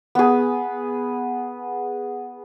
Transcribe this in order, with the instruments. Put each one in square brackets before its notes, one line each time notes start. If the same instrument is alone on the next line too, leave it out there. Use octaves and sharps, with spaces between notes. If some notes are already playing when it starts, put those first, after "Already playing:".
[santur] B3 G#4